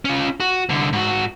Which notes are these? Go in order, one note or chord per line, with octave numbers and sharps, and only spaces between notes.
C#4 F4
F#4
C2 D3
G#2 F#4